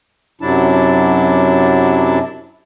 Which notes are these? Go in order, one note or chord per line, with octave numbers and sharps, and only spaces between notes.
F#2 C3 F#3 D4 E4 A5